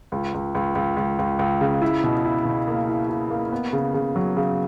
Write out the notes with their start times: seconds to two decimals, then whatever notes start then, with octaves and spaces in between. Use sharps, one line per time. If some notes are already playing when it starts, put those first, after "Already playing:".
0.12 C#2
0.34 C#2
0.55 C#2
0.75 C#2
0.96 C#2
1.19 C#2
1.39 C#2
1.61 C#3
1.82 E4
2.04 B2
2.25 E4
2.45 B2
2.67 A#3
2.88 E4
3.10 E4
3.30 A#3
3.52 B3
3.73 C#3
3.94 C#3
4.16 F#3
4.37 C#3